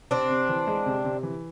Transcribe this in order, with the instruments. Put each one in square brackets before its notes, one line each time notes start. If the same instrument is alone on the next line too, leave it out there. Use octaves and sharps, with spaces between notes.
[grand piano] C3 [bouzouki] C4 D4
[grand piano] C3
E3
G#3
C3
C3
E3